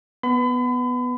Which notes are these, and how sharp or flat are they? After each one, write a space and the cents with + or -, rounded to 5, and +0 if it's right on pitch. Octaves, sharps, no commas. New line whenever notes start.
B3 +0 B5 +40